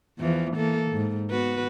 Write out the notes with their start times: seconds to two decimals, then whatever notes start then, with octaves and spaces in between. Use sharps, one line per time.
0.20 E2 E3 F3
0.56 E3 A#3 A4
0.92 G#2
1.31 B3 F#4 B4